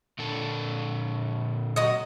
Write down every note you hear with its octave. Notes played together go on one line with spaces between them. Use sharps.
A#2 D3 A4
F#3 D#5